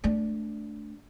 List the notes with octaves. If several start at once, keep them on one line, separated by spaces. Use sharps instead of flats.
A3 D4